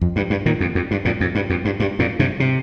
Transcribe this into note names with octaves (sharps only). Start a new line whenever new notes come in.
F2
G2
G2
A#2 D#3
F2
F2
G2
F2 A#2
F2
G2
F2
G2
G2
F2 A#2
G2 C3
C3